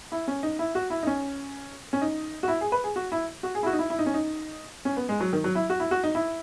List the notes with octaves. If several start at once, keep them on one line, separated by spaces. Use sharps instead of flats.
E4
C#4
D#4
E4
F#4
E4
D#4
C#4
C#4
D#4
F#4
E4
G#4
B4
G#4
F#4
E4
F#4
G#4
E4
F#4
D#4
E4
E4
D#4
C#4
D#4
C#4
B3
G#3
F#3
D#3
F#3
E4
F#4
E4
F#4
D#4
E4